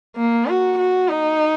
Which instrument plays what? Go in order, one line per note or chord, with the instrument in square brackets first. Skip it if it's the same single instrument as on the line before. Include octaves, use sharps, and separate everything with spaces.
[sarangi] A#3
F#4
F#4
D#4